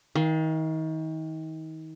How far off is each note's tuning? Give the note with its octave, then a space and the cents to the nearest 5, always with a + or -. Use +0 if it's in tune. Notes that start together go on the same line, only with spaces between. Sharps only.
D#3 +35 F5 +0